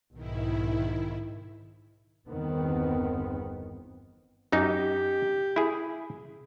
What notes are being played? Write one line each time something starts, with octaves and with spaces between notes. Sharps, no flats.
B1 G#2 D#3 E4
G1 E2 D#3 B3 C4
F#2 D#4 G4
E4 G#4